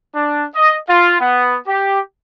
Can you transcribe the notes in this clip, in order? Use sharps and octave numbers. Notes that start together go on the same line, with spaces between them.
D4
D#5
F4
B3
G4